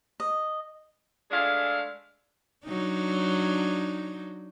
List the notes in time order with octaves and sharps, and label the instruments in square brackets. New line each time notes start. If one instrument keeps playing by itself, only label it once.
[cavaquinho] D#5
[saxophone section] G#3 A3 D4 G#4 F5
[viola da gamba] F#3 D4 D#4